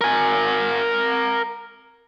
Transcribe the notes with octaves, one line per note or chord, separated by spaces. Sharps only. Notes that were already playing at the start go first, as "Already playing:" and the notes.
A#4 G#5